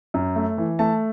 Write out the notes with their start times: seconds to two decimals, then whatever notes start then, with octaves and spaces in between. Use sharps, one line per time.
0.14 F#2
0.36 A3
0.58 E3
0.79 A3 A5